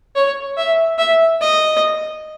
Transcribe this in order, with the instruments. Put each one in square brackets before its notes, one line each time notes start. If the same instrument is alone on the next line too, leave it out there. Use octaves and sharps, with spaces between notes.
[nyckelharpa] C#5
E5
E5
D#5